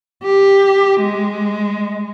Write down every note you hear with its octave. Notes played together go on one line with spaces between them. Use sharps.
G4
G#3